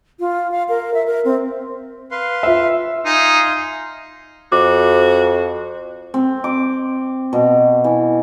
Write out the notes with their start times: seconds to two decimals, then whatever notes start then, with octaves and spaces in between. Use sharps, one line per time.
0.20 F4
0.52 F5
0.69 A#4
0.94 E5
1.06 A#4
1.25 C4
2.11 B4 F5 C6
2.43 F4 E5
3.05 D#4 F5 G#5 C6
4.52 F2 F#4 D6
6.14 C4
6.44 D6
7.33 B2
7.84 E3